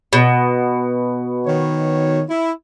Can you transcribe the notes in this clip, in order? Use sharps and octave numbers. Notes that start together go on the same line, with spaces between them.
B2
D#3 C#5
E4